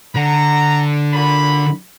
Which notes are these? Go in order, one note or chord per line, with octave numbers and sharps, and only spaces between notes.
D3 F#5 A#5
A#2 F#4 B5